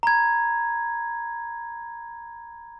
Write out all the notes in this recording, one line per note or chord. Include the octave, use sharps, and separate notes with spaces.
A#5 B5 G#6